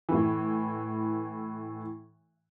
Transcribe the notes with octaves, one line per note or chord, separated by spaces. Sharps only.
A2 E3